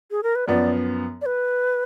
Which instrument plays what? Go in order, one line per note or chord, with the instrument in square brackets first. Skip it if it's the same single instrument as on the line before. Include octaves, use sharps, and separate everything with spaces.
[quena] G#4
A#4
B4
[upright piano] F#2 F3 B3 [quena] D5
[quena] D5
B4